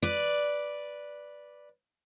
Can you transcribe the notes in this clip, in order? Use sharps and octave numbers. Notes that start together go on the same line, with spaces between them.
B4 D5